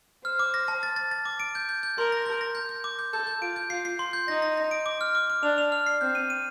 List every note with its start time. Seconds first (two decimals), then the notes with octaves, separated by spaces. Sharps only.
0.25 C5 F6
0.39 D6
0.54 A#6
0.68 A5
0.83 A6
0.96 A6
1.11 A6
1.25 D6
1.40 D7
1.55 G6
1.69 G6
1.83 G6
1.98 A#4 C6
2.12 A#6
2.26 G6
2.41 A#6
2.55 G6
2.69 G6
2.84 D6
2.99 G6
3.13 A4 G6
3.27 G6
3.41 F4 D7
3.56 G6
3.70 F4 C7
3.85 C7
3.99 C6
4.13 G6
4.28 D#4 A#6
4.42 A#6
4.57 A#6
4.71 D7
4.86 D6
5.01 F6
5.15 D6
5.30 D6
5.43 D4 F7
5.58 F7
5.72 F6
5.86 C7
6.01 C4 G6
6.15 D#7
6.30 D#7